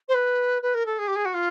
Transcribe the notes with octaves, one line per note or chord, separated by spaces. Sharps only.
C5
B4
B4
A#4
A4
G#4
G4
G#4
F#4
F4